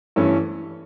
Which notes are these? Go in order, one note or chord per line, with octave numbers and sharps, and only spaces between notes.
G2 E3 A3 C#4